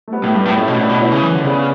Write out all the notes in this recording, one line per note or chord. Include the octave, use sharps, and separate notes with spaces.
A3
G3 B3
A2
G2
A2 B3
A2 A3 C#4
B2
A2 B3 D4
B2
B2 C#4 E4
C#3
E3
D3
C#3 B3 D4